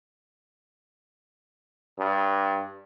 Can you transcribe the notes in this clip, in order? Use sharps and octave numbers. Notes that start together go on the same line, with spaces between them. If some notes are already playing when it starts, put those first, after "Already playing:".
G2